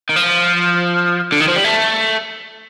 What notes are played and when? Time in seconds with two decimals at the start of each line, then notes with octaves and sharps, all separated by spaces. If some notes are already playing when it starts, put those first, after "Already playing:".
0.09 D#3
0.16 F3
1.32 D3
1.40 D#3
1.48 F3
1.56 G3
1.65 A3